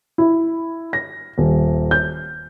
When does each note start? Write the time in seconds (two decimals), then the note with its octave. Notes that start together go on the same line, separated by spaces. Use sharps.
0.18 E4
0.93 A#6
1.38 D#1
1.91 G6